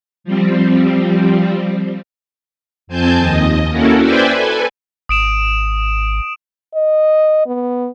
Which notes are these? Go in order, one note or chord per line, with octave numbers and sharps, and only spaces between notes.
F3 G3 C4
F2 C4 G#5 A5 G6
D#2 D#5
A#3 C#4 E4 F#4 A4 A#4
B4 C5 D5 E5 G5 G#5
A4 B4 G#5
G#1 D#6 D7 E7
D#5
B3